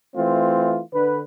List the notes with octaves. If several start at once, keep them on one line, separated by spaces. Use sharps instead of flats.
E3 A3 C4 F4
D3 B4